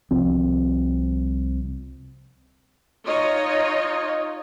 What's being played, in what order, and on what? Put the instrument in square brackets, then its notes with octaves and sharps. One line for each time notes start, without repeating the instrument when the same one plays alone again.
[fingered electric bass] C2 F3 C4
[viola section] D#4 F4 C#5 D#5